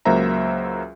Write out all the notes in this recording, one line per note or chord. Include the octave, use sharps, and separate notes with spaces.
C#2 F#3 A#3 C5 E5 A#5